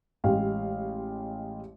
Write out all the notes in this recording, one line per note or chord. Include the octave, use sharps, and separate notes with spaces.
A1 G#3 G4 F5